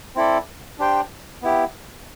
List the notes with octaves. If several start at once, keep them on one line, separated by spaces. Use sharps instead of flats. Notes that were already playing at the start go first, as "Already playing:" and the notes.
C4 E4 A4 D5
D4 G4 C5 G5
B3 E4 G4